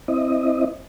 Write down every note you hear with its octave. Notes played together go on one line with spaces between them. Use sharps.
C4 E4 D#5